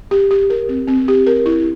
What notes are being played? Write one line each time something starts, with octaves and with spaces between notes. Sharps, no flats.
G4
G4
A#4
C4
C4
G4
A#4
E4